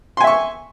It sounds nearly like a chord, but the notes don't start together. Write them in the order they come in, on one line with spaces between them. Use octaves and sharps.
C6 G#5 E5 C#6